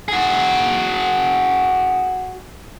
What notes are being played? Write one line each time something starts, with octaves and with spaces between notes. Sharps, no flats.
F#4 G#4